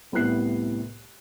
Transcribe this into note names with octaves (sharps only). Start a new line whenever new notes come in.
C2 A2 C3 B3 F#6 C7